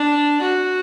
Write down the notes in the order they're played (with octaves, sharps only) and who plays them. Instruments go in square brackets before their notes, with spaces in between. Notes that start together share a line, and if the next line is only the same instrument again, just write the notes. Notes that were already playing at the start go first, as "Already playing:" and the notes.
Already playing: [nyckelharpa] D4
F#4